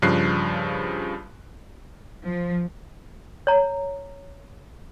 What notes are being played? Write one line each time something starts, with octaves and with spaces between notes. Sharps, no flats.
G2 C#3 F3 F#6 C7
F3
C#5 A#5